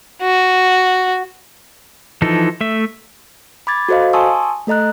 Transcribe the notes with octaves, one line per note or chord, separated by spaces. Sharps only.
F#4
E3 F3 D#4 A4
A3 E5
B5 D6 G#6 A6
F#4 A4 C5 D#5 F5
G#5 A5 C6 C#6 D#6 E6
A3 A4 D#5 A#5 F#6